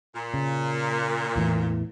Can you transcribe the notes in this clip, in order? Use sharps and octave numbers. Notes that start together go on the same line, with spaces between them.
A#2
C#3
E2 A2 E3